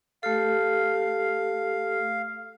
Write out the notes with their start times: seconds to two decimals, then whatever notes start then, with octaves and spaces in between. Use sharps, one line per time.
0.23 A3 G4 A4 F5